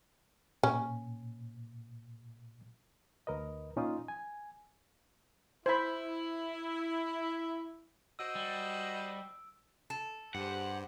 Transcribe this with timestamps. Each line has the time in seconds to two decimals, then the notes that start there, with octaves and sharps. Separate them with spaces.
0.63 A#2 C#4
3.27 D2 A#4 B4 D#5
3.76 A#2 C#4 D#4 F4 C6 D#6
4.08 G#5
5.66 E4 C5 B5
8.19 F#4 C5 D#5 E6 D7
8.35 G3
9.90 A4
10.35 G2 G4 G#4 C5 F#5